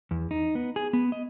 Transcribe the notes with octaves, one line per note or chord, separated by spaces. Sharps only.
E2
D#4
B3
G#4
B3
D#5